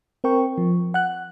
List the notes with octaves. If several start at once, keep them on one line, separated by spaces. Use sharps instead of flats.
C4 A#4 G5 C#6
F3
F#5 F#6